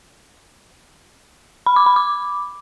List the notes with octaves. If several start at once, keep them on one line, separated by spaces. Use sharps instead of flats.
B5
D6
B5
D6